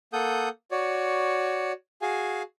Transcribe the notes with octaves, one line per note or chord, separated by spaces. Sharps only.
A#3 A4 F#5 D#6 G6
F#4 C#5 D5
F#4 G#4 F5 G#5